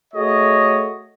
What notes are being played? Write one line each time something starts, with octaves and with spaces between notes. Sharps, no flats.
A3 F#4 G#4 C#5 D#5